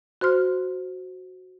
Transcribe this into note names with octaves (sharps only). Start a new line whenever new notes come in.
F#4 C5 C6 F6